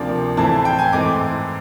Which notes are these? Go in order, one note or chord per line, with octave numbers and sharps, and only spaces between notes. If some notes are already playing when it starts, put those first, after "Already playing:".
Already playing: D2 C3 F3 A#3 D4
A2 E3 A3 C4 E4 A5
A5
G5
G#5
G#2 E3 A3 C4 D6